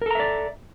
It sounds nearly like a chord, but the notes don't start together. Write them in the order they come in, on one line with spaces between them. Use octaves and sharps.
A#4 A4 A#5 E5 D5